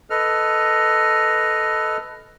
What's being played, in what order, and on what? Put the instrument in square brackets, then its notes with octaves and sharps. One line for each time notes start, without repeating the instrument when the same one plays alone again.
[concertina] A4 B4 D#5 F6